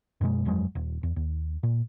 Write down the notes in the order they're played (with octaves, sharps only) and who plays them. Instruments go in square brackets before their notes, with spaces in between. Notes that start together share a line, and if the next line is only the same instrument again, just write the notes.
[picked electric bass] F#2 B2 G3 G#3
G1 F2 F#3 G#3
D#1
E2
D#2
A#2